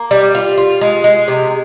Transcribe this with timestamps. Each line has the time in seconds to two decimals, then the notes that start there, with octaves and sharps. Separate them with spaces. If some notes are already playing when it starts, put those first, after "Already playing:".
Already playing: A#3
0.11 G3
0.35 F4
0.58 F4
0.81 G#3
1.04 G#3
1.28 C3